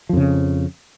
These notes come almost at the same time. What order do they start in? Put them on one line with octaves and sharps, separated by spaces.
F3 F2 C#3